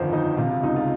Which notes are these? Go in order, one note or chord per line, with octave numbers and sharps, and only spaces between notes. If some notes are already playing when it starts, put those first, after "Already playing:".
Already playing: G1 F2 D#3 C5
F2 D#4
C3 F4
F4
C#2 D#4
F4